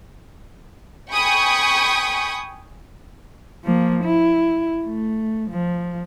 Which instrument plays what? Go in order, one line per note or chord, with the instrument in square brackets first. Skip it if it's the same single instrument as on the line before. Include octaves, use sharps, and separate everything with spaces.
[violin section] G5 G#5 B5 C#6 D#6
[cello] F3 A#3
E4
A3
F3